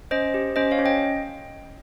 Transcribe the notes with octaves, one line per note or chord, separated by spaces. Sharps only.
C#4 C5 D#5
G4
C#4 C5 D#5
C#5 F5
C#4
D#5 G5